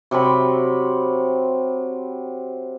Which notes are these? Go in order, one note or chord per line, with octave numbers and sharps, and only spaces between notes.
C3 F#3 C4 B5